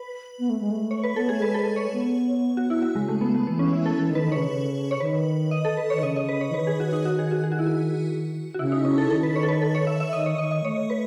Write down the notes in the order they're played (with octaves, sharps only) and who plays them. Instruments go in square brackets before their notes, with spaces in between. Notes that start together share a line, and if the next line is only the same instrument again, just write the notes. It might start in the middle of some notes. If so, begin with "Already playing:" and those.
Already playing: [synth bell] B4
[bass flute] B3
A3
G#3
A3
[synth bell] C#5
B4
[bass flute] B3 [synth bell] A4
[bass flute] A3 [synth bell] G#4
[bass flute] G#3 [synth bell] B4
[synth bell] A4
B4
C#5
[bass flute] B3
[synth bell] F#4
E4
F#4
[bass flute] C#3 [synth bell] G#3
[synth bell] A3
B3
A3
[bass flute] E3 [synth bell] B3
[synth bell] C#4
E4
A4
[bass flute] E3 [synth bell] A4
[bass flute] D#3
[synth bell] B4
[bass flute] D#3
[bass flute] C#3 [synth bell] C#5
[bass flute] C#3
[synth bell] C#5
[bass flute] D#3 [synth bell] B4
[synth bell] D#5
A4
B4
[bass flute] D#3 [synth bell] C#5
[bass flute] C#3 [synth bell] D#5
[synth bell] D#5
B4
C#5
[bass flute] E3
[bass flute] D#3 [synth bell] B4
[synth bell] G#4
F#4
D#4
F#4
G#4
F#4
G#4
F#4
E4
F#4
F#4
[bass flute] C#3 [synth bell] E4
[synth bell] D#4
C#4
A4
[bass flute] D#3 [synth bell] A4
[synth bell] B4
C#5
A4
B4
A4
C#5
E5
E5
[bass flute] D#3 [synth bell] D#5
[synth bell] C#5
[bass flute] D#3 [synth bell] D#5
[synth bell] D#5
[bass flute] A3 [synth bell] C#5
[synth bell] B4